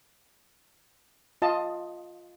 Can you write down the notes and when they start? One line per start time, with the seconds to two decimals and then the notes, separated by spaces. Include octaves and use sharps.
1.42 F4 D#5 A5